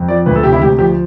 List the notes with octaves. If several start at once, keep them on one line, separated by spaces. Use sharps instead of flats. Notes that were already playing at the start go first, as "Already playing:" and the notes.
Already playing: F2
F3 D5
D2 B4
A4
C3 G4
E4
D2 G4
F3 G4